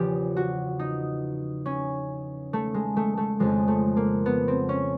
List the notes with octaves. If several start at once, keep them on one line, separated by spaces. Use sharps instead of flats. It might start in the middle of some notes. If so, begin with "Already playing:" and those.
Already playing: E2 C#3 F3 G4
F#4
D#4
C#4
A3
G#3
A3
A3
F2 C#3 F3 G#3
A3
A#3
B3
C4
C#4